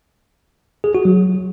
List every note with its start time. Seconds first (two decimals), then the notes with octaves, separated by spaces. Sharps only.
0.84 G#4
0.95 F#4
1.05 F#3